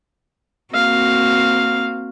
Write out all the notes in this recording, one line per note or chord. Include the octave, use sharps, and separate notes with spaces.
A#3 C4 F#4 F5